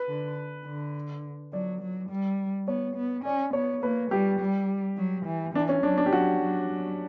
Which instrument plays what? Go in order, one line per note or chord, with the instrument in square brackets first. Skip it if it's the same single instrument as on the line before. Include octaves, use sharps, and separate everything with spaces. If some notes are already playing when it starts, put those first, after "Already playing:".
Already playing: [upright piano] B4
[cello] D3
D3
[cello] F#3 [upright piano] D5
[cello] F#3
G3
[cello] B3 [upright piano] C#5
[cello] B3
[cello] C#4 [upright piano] D5
[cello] B3 [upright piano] C#5
[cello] A#3 [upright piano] B4
[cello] G3 [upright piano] G4
[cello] G3
F#3
E3
[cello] E3 [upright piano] D4
[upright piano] C#4
[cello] F#3 [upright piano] D4
[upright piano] D4
G4
[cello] F#3 [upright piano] F#4
[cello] F#3
F#3